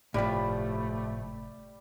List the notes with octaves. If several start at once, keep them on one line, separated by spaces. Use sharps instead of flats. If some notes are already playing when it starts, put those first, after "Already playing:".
G1 A2 C3 F3 G3 A3 D5 B5